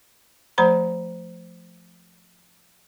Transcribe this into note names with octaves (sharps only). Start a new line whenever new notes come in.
F3 A3 C5 A#5 B5